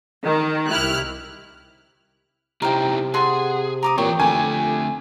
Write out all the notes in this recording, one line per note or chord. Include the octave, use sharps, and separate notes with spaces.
D#3
C2 E4 G4 F6 F#6
C3 C4 D#4 E4 A#4 G5
G#4 A4 F#5 C6
A#5 D6 D#6
A#2 E3 G4 C#5 C#6
F2 D3 A3 G#5